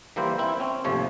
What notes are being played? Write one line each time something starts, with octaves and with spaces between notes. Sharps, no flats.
E3 G3 A#3 E4 A#4 C5
C4 E4
C4 C#4
G#1 D#2 C3 F3 A3 C#5